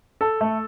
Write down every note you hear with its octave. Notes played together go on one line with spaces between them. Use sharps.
A4
A3